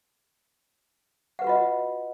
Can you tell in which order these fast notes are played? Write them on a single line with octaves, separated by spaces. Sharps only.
F#5 B4 F#4 F4 D#5